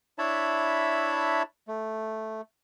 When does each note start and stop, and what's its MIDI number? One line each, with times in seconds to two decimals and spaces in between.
0.19 1.43 62
0.19 1.43 64
0.19 1.43 73
0.19 1.43 76
0.19 1.43 81
0.19 1.43 83
1.68 2.41 57